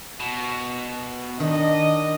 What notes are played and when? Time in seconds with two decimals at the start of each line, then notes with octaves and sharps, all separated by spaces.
0.20 B2
1.40 D#3 D4 D#5